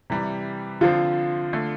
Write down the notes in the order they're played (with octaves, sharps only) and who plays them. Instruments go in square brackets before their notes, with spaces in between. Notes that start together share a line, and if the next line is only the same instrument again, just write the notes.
[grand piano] C3 E3 G3
[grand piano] D3 F3 C4 [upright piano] F4
[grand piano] D3 A3